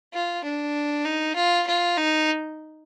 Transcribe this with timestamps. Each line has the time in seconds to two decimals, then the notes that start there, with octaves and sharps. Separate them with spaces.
0.13 F4
0.44 D4
1.05 D#4
1.36 F4
1.66 F4
1.97 D#4